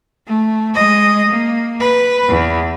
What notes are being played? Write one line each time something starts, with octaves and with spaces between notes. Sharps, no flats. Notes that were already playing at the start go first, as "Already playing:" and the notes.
A3
G#3 D#5
A#3
B4
E2